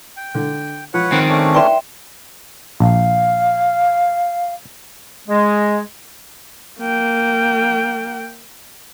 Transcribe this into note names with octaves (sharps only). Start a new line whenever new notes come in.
G5
D3
F3 B4 C#5 F#5
D#3 C4
A3 C#4 D4
B4 D5 E5 G5 C6
A#1 F5
G#3
A#3 G5